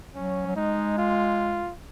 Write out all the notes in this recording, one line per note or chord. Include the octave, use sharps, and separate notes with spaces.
F#3 C#4
F#3
G#3 D#4
F4